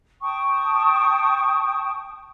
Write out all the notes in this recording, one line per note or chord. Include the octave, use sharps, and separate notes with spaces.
G5 A5 C#6 D#6